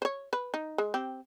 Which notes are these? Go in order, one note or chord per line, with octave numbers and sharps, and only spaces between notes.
C5 C#5
B4
D#4
G#3
C4 G4